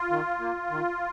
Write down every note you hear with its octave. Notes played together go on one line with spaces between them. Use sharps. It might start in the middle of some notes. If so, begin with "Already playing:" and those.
Already playing: F4
D#3
A#3
D#3